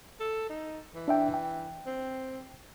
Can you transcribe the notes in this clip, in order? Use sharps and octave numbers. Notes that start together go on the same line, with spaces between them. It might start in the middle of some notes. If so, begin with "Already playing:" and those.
A4
D#4
E3
D4 E5 G5
G5
C4